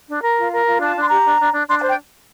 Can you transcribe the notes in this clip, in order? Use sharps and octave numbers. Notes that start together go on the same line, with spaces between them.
D4
A#4
F4
A#4
F4
D4 A5
D4
C6
G4 A#5
D4
D4
D4
D4 C6
A5
C5
G5